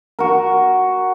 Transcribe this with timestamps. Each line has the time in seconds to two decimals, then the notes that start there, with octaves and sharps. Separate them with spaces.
0.19 F#4 A#4